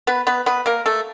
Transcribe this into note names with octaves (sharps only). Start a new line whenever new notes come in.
B3 B4
B3 B4
B3 B4
A#3 A#4
A3 A4